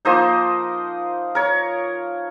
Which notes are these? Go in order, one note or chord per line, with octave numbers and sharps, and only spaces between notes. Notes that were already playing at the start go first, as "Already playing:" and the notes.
F3 A#3 D#4 C5 D#5
A#4 C#5